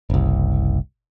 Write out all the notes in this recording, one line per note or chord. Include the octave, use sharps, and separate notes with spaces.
F#1 C2